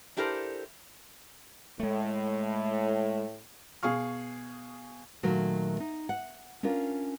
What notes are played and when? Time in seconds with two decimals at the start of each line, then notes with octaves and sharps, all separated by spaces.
0.17 D4 E4 G4 A4 A#4 C5
1.80 A2 G#3 A3
3.83 B2 G#4 F5 C#6 F6
5.23 A#2 D#3 F#3 A3
5.80 D#4
6.09 F#5
6.63 C#4 D4 F4 A#4